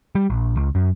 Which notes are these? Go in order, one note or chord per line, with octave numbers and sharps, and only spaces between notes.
G3
A#1
C#2
F#2